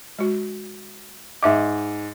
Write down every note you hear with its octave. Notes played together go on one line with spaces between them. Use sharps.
G#3 F#4
G#2 D#5 E5 D6